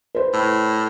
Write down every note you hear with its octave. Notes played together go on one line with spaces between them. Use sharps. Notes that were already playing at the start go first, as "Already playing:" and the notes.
B4 C5
A2